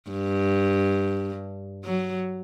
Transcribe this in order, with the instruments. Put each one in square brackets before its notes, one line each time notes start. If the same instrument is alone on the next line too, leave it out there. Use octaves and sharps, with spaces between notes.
[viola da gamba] G2
F#3